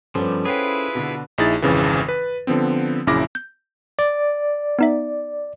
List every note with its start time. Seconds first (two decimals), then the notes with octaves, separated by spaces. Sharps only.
0.15 G2 F3 G3 B3 C#4 A4 C5
0.45 E4 F4 G#4 B4 C#5 F#5 G5
0.95 B2 D3
1.38 A#1 D#4 E4 G#4 A6
1.62 G#1 F2 C#3 E3
2.09 B4
2.47 D3 F3 B3 C4
3.07 A#1 F#2 C#3 E4 D6 A#6
3.35 G6
3.99 D5
4.79 B3 D#4 E5